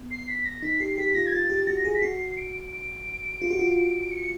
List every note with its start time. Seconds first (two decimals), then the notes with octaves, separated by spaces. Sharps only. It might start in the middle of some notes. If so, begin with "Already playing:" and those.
Already playing: B3
0.11 C7
0.28 B6
0.45 A#6
0.63 D#4 B6
0.80 G4 C7
0.98 G4 B6
1.15 F4 A#6
1.26 G#6
1.32 F4 A6
1.50 G4
1.67 F#4 A#6
1.85 G#4
1.95 B6
2.02 F#4 C7
2.37 D7
2.73 D7
3.42 F4
3.50 F#4
3.59 F4
4.11 C#7